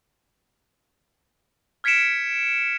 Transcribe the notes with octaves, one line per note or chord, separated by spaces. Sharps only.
F6 G#6 B6 C#7 D7 E7